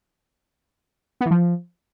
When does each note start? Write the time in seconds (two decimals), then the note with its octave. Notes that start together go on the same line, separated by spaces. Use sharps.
1.21 B3
1.26 E3
1.31 F3